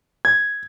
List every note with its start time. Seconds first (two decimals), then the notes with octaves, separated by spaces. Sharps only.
0.25 G#6